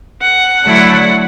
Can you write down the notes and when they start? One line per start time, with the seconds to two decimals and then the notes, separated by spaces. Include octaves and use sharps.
0.22 F#5
0.64 D3 F#3 A3 E4